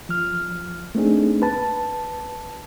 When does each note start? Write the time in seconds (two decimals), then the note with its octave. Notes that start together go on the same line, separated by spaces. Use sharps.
0.09 F3 F6
0.95 A3 A#3 C4 D4 D#4 G#4
1.42 B4 A5